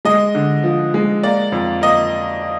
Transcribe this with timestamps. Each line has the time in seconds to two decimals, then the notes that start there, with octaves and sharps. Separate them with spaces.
0.05 G#3 D#5
0.35 D3
0.63 F3
0.94 G#3
1.23 A#3 D5
1.52 F2
1.82 A#3 D#5